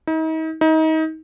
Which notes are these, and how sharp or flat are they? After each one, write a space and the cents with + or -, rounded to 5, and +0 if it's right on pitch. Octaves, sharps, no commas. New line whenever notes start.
D#4 +40
D#4 +30